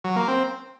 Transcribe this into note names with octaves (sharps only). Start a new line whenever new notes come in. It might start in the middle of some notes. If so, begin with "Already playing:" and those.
F#3
A#3
C4